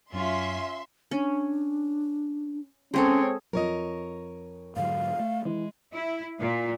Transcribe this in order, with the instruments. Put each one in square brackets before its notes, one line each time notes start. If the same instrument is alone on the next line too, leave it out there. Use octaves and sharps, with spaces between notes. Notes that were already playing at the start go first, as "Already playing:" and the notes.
[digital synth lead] F#2 [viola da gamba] C#4 F4 [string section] E5 C6
[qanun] C#4 [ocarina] D4
[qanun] G#3 G#4 A4 [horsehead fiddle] C4 C#5 [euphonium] C#4
[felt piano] F2 [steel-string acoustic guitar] A#4 C#5 D#5
[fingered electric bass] G#2 D3 F#3 [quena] F5
[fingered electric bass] A3
[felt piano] E3 [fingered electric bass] G#3
[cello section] E4
A#2